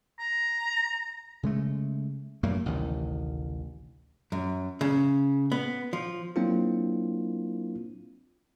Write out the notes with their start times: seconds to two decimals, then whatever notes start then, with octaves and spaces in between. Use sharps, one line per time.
0.19 A#5
1.43 C#3 G#3 A3
2.43 F#2 F#3 A3 A#3
2.66 A1 D2 C3 D#3
4.32 F#2
4.81 C#3
5.52 B3
5.93 F3
6.36 F#3 A#3 C4 D4 E4 F4